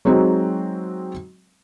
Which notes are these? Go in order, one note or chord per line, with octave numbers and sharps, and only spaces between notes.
F#3 G#3 C4 D#4 F#4